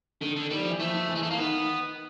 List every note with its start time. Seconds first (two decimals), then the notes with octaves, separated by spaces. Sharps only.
0.21 D3 D#3
0.36 D3
0.51 D#3 G3
0.60 F3
0.70 E3
0.80 F3 A3
0.95 F3
1.08 E3
1.15 G#3
1.23 A3
1.30 A#3
1.38 D#3 B3